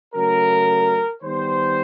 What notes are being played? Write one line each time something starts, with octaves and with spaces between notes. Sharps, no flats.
C#3 F#3 A3 A#4
D#3 G3 B3 C5